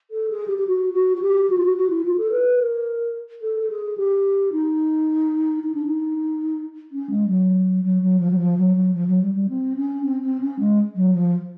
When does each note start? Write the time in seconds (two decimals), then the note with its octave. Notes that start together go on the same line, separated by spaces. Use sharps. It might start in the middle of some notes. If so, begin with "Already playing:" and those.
0.11 A4
0.30 G#4
0.47 G4
0.58 G4
0.67 F#4
0.93 F#4
1.17 F#4
1.21 G4
1.49 F#4
1.57 F4
1.65 F#4
1.77 F#4
1.90 E4
2.05 F4
2.18 A4
2.32 B4
2.59 A#4
3.42 A4
3.60 A4
3.69 G#4
3.97 G4
4.52 D#4
5.63 D#4
5.74 D4
5.86 D#4
6.91 C#4
7.10 G#3
7.27 F#3
7.83 F#3
8.01 F#3
8.19 F3
8.30 F#3
8.38 F3
8.57 F#3
8.75 F#3
8.93 F3
9.07 F#3
9.22 G3
9.34 G3
9.49 C4
9.76 C#4
10.04 C4
10.22 C4
10.40 C#4
10.59 G#3
10.95 F#3
11.14 F3